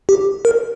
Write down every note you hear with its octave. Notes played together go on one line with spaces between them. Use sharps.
G4
A#4